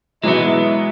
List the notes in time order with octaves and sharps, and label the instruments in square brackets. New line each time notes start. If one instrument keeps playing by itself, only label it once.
[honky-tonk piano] B2 E3 F#3 [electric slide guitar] G#3 B3 [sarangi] E4